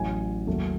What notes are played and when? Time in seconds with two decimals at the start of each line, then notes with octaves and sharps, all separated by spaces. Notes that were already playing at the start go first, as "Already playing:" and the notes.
Already playing: A1 A2 F#3 A3 G#5
0.47 D#2 C#3 F#3 A3